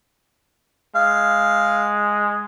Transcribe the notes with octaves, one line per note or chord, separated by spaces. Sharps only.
G#3 F5